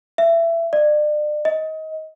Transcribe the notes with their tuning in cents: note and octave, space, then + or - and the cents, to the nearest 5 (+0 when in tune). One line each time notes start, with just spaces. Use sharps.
E5 +20
D5 +35
D#5 +25